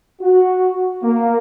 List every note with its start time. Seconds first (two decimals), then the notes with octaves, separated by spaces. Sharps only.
0.22 F#4
1.02 A#3